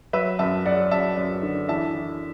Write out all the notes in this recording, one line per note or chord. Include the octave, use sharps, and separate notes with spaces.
F#3 B4 E5
F#2 E5 A5
F#3 D5 F#5
F#2 E5 A5
F#2
D3
E3 E5 A5
E3